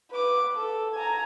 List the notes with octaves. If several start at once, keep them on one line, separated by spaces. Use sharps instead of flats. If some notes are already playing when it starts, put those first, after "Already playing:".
B4 D6
A4
G#5 A#5